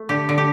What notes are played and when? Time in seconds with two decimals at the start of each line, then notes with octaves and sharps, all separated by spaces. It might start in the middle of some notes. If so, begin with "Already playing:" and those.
Already playing: A3
0.09 D3 G4
0.29 D3
0.38 G4